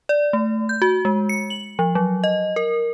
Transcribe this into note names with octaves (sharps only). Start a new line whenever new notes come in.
D5
A3
G6
F#4
G#3
C#7
F#7
F3
F#3
D#5
A#4